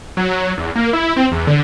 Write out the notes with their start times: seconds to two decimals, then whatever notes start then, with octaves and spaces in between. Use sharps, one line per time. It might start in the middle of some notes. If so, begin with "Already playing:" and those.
0.17 F#3
0.57 E2
0.76 A#3
0.93 E4
1.16 C4
1.32 E2
1.47 D3